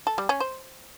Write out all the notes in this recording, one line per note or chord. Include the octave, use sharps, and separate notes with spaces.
A4
G3
C#4
C5